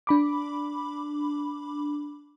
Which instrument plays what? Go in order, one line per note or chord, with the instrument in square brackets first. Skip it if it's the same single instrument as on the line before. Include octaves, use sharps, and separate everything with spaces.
[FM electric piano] D4 B5 D6